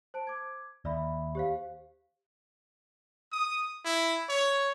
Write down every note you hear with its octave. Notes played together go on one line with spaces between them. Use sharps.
C5 A5 D7
D6 G#6
D#2 D5 E5 B5
G4 C5 F5
D#6
E4
C#5